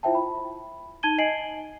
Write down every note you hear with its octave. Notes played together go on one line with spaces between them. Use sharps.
E4 F4 C5 E5 G5 A5
B5
D#4 A5 G#6 D#7 G7
D#5 G#5 C7 D7 F#7